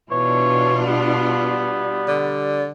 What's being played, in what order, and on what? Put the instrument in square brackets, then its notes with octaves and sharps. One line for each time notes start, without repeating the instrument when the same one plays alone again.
[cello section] B2 D4 F4 [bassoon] E3 [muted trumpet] C#5
[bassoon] G3 [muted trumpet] B3
[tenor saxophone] D3